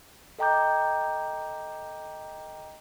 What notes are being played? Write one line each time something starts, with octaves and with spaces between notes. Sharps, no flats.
A4 D#5 G5 A#5 D6 G6